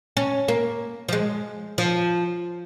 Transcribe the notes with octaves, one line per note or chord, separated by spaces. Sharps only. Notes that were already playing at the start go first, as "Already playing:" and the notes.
C#4
A#3
F3
G#3
F3